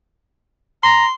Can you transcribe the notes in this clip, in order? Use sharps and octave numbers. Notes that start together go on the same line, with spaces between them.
A#5 C6